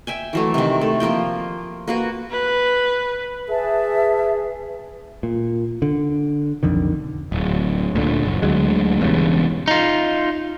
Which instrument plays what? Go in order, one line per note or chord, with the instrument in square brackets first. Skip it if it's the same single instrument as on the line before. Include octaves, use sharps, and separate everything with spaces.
[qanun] E5 G5 G#5
E3 F#3 A3
C3 D#3
A3
F3 A#3 F4 G5
A#3 F#4 B4
[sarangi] B4
[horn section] G#4 [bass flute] B4 [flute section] E5 A5
[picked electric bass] A#2
D3
B1 F2 D3 D#3
D1
D2 A#2 D3
F#1
D2 D3 F#3 G#3
E1 E2 G2 C#3
[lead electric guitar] D#4 F4